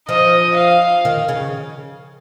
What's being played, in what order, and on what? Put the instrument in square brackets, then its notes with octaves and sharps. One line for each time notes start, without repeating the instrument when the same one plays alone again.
[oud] F3 [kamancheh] D#5
[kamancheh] F5
[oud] D#3
C#3